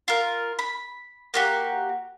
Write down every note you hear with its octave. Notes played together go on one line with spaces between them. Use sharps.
F4 A#4
B5
A#3 F#4 G4